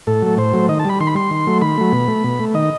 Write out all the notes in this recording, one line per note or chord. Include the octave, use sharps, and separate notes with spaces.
A2 A4
F#3 A3
A2 C5
F#3 A3
D#3 D#5
A5
G3 B5
D#3 C6
B5
G3 C6
D#3
F#3 A3
D#3 B5
F#3 A3
B2
A3
B2
A3
D#3 D#5